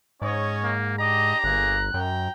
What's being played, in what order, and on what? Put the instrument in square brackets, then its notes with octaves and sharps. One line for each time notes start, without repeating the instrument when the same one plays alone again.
[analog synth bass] G#2 [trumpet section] C#4 C#5 [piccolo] D#5
[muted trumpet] A#3
[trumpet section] D4 G4 [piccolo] D#5 [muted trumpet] A#5
[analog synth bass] G1 [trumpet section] A#3 G#4 [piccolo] F#6
[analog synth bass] F#2 [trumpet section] G5 A#5